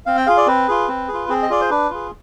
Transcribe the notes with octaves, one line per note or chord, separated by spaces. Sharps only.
C4 F5
G5
F4 G#4 F5
D5
C4 B4
F4 G#4
C4
G#4
F4
C4 G#4
D#5
F4 G#4 D5
C5
D4 B4
F4 G#4